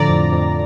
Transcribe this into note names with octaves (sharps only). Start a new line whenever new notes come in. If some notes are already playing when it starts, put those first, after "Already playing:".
Already playing: A2 D3 F3 D5 A#5
F2
F2